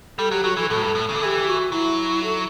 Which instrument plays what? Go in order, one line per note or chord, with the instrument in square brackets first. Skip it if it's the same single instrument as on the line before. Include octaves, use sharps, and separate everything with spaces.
[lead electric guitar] G3 [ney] A4
[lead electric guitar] F#3 [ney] G4
[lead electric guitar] F#3 [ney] F#4
[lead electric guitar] E3 [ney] A4
[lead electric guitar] A2 [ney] A4
[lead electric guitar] G2
A2
C#3
D3
[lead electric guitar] E3 [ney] G4 A4
[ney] F#4
[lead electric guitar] F#3 [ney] E4
[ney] A4